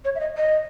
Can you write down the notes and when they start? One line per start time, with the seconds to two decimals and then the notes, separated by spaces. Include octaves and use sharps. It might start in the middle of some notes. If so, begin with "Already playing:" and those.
0.05 C#5
0.15 E5
0.20 D#5
0.37 D#5